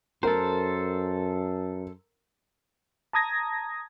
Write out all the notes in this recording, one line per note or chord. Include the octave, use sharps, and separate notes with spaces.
F#2 A4 A#4 C5
A5 A#5 D#6 G#6 A#6